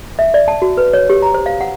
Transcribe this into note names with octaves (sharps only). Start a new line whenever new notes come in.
E5
D5
A5
F#4
B4
C#5
G4
A#5
C5
F5
F#5